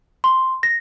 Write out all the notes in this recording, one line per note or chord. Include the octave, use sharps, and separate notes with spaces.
C6
A#6